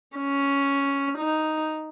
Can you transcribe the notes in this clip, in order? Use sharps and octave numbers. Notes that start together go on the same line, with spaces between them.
C#4
D#4